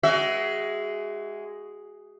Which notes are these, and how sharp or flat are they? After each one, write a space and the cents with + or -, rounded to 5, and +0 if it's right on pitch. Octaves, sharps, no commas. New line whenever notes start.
G#3 +0 F#4 +30 E5 +0